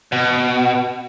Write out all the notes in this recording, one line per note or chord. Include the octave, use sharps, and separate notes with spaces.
B2